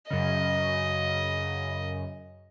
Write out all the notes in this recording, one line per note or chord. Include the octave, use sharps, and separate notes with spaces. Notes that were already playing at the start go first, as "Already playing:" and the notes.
F#2 C#3 D#5